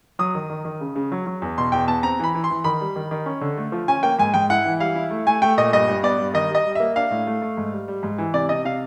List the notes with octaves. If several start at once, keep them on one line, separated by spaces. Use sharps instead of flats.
F#3 D#6
D#3
D#3
D#3
C#3
C#3
F#3
F#3
E2
B2 C6
E2 G5
B3 A5
C4 A#5
E3 B5
E3
C6
E3
D#3 B5
G3
D#3
D#3
C#4
D3
A3
F3
C#4 G#5
A#3 G5
G#2 G#5
G#2 G5
E4 F#5
E3
G3 F5
E4
A3
A3 G#5
A3 G5
A#2 D#5
G2 D#5
G2
B3 D5
G2
D#3 D#5
G3 D#5
G3
A#3 E5
D4 F5
A2
A3
A3
G#2
G3
G3
G#2
E3
C3 D5
C3 D#5
C3 F5